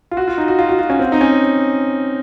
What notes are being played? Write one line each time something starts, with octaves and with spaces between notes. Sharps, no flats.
F4
F#4
F4
D#4
F#4
F4
F#4
F4
C#4
C4
D#4
C#4